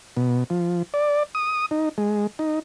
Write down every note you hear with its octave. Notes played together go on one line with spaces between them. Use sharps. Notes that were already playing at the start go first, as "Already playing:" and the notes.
B2
F3
D5
D#6
D#4
G#3
D#4